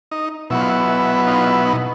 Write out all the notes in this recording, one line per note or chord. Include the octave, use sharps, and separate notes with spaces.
D#4
B2 F#3 B3 E4
F4
E4
D#4 F4
E4
D#4